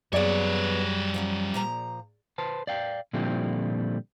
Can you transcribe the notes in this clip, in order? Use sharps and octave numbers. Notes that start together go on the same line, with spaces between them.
F#2 G3 A#3 B3 G#4 C#5 D5
F3 F#3 C#4
A#2 F3 A#5
B4 C5 A5
D5 F5 G5
A#2 D3 F3 G3 C4 E4